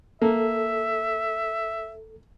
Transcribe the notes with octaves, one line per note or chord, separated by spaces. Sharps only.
A#3 A4 E5